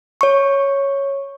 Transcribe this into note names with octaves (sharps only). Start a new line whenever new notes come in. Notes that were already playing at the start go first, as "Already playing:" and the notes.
C#5 C#6